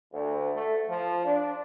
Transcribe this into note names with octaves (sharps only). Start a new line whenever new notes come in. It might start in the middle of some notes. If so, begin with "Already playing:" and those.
D2
A3
F3
D4